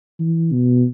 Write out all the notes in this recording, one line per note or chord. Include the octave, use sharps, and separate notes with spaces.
E3
B2